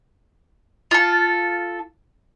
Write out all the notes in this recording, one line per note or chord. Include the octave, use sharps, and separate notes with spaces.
F4 A4